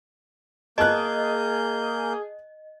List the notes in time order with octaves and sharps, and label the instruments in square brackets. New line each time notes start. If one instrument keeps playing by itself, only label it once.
[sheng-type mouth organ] A#3 G6 [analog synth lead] G#4 [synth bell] D#5 [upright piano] A5 F#6